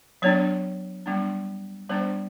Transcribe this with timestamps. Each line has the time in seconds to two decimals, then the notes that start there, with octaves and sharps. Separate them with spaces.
0.22 F#3 B3 D4 C#5
1.06 G3 B3 D4
1.90 G3 B3 D4 C5